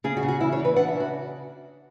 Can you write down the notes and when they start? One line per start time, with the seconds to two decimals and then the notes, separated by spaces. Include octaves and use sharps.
0.04 C#3 G#4
0.17 F#4
0.23 C#3
0.28 F#4
0.40 E3 E4
0.52 C#5
0.59 E3
0.65 B4
0.76 D4 F#5
0.88 E5
0.94 C#3
1.00 F#4